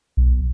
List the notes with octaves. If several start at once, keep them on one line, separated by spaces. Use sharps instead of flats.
B1